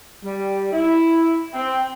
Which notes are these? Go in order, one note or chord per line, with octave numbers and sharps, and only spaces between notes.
G3
E4
C4